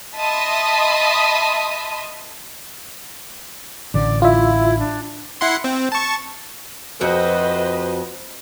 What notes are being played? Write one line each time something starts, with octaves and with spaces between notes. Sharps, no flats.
D#5 E5 A5 B5 C6 D#6
A1 D3 D5
E4 F4 E5
D4
E4 F#5 C6
C4
A5 C#6
F2 F#4 B4 C5 D#5 E5